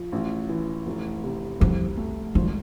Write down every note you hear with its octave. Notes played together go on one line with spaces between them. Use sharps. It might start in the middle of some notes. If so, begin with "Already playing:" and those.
Already playing: F3
A1
E3
F1
C3
C2 F2
A3
G#1 F2